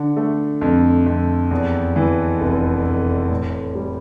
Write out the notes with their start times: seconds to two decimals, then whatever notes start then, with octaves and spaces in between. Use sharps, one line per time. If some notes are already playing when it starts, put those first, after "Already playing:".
Already playing: D3
0.17 A3
0.61 F2
1.06 F2
1.51 E2
1.96 E3
2.41 F1
2.86 F1
3.30 A2
3.75 G3